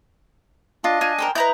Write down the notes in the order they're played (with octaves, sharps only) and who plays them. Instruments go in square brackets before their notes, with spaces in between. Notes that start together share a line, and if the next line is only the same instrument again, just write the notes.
[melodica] D4 D#5 [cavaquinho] F4
[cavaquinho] F4 [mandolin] G#5
[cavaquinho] A#4 C5 G5
[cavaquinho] E4 [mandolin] B4 A#5 G6 [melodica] D#5